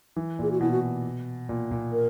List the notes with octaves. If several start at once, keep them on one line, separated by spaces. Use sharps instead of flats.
E3
A#2 G#4
F#4
B2 E4
F#4
A#2
A#2
A#4